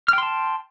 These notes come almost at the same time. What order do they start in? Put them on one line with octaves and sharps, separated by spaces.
F6 G5 C6 A5